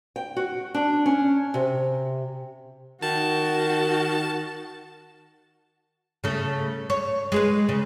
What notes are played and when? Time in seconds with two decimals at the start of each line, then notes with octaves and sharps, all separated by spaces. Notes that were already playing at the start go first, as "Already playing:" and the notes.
0.16 G5
0.36 F#4
0.74 D4
1.06 C#4
1.54 C3
3.03 D#3 F#4 A5
6.24 C#3 A3
6.90 C#5
7.32 G#3 G#4 B4
7.69 C#3